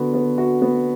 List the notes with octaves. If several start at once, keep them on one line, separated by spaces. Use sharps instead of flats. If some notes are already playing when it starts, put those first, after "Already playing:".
Already playing: D3 B3 F#4
B3
F#4
B3